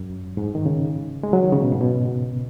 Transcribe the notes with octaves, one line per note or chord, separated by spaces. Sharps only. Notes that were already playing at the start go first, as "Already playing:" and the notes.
Already playing: F#2
G#2
D#3
C#3
G#3
F#3
D#3
C#3
B2
G#2
B2